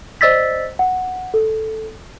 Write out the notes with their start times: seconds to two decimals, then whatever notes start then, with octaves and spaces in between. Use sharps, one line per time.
0.21 C5 D5 D#5 E6 A6 B6
0.79 F#5
1.34 A4